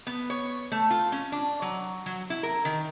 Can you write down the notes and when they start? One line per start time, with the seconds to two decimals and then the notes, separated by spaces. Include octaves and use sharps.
0.07 B3
0.30 C#5
0.72 A3
0.91 F4
1.12 C#4
1.32 D4
1.62 F#3
2.06 F#3
2.30 E4
2.43 A#4
2.65 D#3